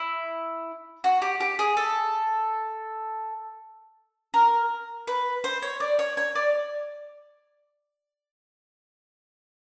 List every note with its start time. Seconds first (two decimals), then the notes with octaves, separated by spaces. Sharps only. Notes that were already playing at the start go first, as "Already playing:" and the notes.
Already playing: E4
1.04 F#4
1.22 G4
1.40 G4
1.59 G#4
1.77 A4
4.34 A#4
5.07 B4
5.44 C5
5.62 C#5
5.80 D5
5.99 C#5
6.17 C#5
6.35 D5